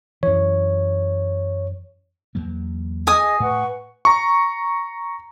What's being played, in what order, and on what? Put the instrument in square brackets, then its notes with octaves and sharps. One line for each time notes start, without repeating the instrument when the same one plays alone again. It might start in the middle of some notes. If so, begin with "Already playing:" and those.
[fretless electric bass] F#2 E3 [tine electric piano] C#5
[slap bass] E2 F#3 A#3
[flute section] G#4 D#5 [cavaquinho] G#5 D#6
[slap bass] A2 [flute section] B4 F#5 C#6
[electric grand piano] A#5 C#6